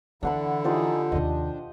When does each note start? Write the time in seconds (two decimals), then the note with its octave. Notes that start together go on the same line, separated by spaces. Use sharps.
0.23 D3 E3 D4 E4 F#5 B5
0.64 F3 D#4 E4 G4 G#4 D5
1.12 D#2 C3 D4 D#5 D#6